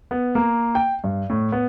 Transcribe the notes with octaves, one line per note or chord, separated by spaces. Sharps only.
B3
A#3
G5
G2
A2
B3